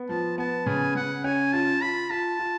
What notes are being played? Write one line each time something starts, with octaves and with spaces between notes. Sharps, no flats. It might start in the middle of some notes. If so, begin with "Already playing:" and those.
Already playing: B3
F3 A5
B3 A5
C#3 G#5
C#3 F#5
C#4 G#5
F4 A5
F4 B5
F4 A5
F4